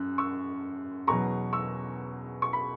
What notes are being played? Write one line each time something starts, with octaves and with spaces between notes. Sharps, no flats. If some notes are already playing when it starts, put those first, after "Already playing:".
Already playing: F#2 F#6
C#6 E6
E2 B2 F#3 A#5 C#6
C#6 E6
C#6
B5